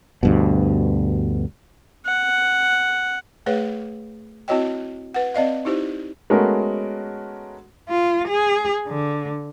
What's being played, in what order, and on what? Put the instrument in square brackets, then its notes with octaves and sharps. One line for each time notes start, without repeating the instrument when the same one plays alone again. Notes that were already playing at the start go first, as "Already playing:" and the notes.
[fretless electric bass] D2 G2 B2
[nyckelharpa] F#5
[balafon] A3 G#4 B4 C#5 F5
C4 E4 F#4 C#5 D#5 G5
B4 F#5
C4 D5 D#5 F5
D#4 E4 G4 C5
[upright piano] G#3 A3 B3 C#4 F#4 A#4
[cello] F4
G#4
D3